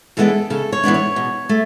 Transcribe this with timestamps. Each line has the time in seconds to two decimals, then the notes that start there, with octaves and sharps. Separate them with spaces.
0.17 E3 G#3 B3 D4 A4
0.50 C#3 A4
0.73 C#5
0.83 E3 G#3 B3 D4
0.94 C#5
1.16 B2
1.49 A3